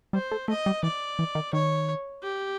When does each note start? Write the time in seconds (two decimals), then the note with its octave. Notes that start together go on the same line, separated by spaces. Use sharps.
0.13 G3 C5
0.31 A3
0.48 A3 D#5
0.66 G3
0.83 E3 D5
1.19 E3
1.35 D#3
1.53 D#3 C#5
2.23 G4